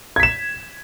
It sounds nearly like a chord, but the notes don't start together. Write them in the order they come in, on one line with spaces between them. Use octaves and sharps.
G#6 B6 E7